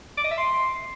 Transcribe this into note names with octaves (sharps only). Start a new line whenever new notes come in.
D6
D#5
E5
C6